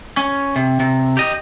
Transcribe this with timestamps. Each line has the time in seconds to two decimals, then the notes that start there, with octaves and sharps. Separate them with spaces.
0.17 C#4
0.56 C3
0.80 C3
1.17 G4 D#5